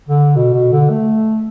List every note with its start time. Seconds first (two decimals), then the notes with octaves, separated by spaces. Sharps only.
0.09 D3
0.36 B2
0.54 B2
0.72 D3
0.90 A3